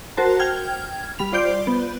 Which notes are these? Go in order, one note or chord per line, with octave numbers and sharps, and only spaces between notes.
F#4 A#4 C5 A5
G5 F6 G#6
G3 B5 F7
F4 C5 D5 G6 D7
B3